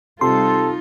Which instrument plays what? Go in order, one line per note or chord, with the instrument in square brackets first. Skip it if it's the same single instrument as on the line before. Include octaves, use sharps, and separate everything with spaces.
[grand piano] C3 [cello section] G3 D#4 F4 [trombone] A4 [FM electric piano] C6